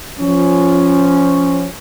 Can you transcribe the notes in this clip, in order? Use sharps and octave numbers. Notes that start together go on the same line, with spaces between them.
F3 C#4